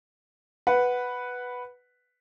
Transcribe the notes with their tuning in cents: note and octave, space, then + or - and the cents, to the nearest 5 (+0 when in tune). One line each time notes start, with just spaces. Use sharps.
B4 +0 F#5 +0